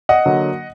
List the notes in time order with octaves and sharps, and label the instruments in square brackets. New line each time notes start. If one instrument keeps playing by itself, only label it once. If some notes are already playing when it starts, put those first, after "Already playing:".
[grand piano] D#5 F#5
D3 F#3 A#3